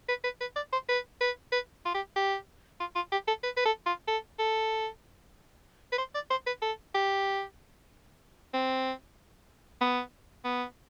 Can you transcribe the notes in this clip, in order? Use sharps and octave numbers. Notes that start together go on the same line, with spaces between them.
B4
B4
B4
D5
C5
B4
B4
B4
F4
G4
G4
F4
F4
G4
A4
B4
B4
A4
F4
A4
A4
B4
C5
D5
C5
B4
A4
G4
C4
B3
B3